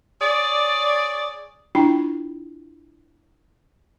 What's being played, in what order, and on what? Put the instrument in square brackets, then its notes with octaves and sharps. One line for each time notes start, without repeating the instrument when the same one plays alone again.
[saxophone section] G#4 C#5 D5
[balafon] D4 E4 F4 G5